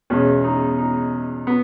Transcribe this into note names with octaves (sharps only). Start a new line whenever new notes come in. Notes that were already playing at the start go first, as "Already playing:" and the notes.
E2 B2 G#3 C#4
D#4
D#4
B3